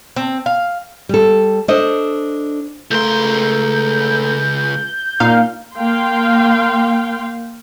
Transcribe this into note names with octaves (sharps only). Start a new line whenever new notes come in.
C4
F5
G3 A4
D4 A4 C5 D#5
C#2 A3 A#4 C6 G6
A#2 D#4 F5 A#5
A#3 F5 G5 C6